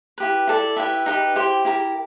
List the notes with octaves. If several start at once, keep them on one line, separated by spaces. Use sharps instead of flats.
E4 G4 B4
E4 A4 D5
E4 G4 B4 E5
D#4 G4 B4
E4 G4 C5
E4 G4 A#4